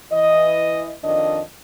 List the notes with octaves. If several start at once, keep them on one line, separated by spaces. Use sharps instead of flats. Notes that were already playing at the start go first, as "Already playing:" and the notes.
E3 D#5
F2 D#3 D4 D#5